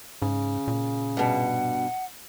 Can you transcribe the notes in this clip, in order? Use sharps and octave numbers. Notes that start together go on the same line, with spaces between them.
G#2 C#3
A#2
G2 B2 F#5